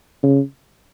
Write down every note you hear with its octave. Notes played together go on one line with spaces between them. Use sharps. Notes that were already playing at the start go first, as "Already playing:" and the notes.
C#3